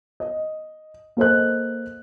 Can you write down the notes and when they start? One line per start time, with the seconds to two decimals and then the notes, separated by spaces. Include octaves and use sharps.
0.20 D#5
1.17 A#3 A4 C5 D#5 F#6